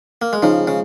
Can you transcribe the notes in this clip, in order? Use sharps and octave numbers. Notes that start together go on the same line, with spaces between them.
A#3
G#3
C#3 F3 D#4
G#3
C#3